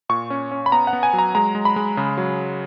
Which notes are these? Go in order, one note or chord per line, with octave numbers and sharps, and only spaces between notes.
A#2 C#6
C#4
C#4
B5
B3 A#5
F#5
B3
G#5
F#3
A#5
G#3 A#5
G#3
B5
G#3
C#3
F#3